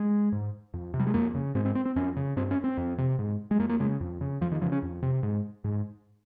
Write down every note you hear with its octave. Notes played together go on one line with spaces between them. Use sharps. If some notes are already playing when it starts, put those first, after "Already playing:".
Already playing: G#3
G#2
F2
C3
G3
G#3
F2 A#3
C#3
G#2 C4
C4
C4
C4
F2 C#4
C#3
G2 C4
C#4
C4
F2
C3
G#2
G#3
F2 A#3
A#3
C#3 G#3
F2
C#3
F2 F3
D#3
C#3 F3
C#4
F2
C3
G#2
G#2